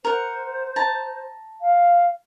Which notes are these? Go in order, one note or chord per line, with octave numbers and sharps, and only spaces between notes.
A#4 C5 F#5
A5 A#5
F5